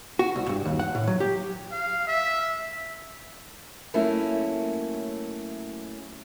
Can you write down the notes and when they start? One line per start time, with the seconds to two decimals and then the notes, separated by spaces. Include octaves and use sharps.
0.19 F#4
0.36 C2
0.49 G2
0.65 D#2
0.79 F#5
0.95 A2
1.07 F#3
1.20 G4
1.72 F5
2.07 E5
3.94 F#3 A3 A#3 C#4 E4